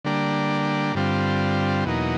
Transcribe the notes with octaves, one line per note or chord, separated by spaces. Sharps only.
D3 G3 A#3 D4
G2 D3 G3 C4 F4
E2 B2 F#3 A#3 D#4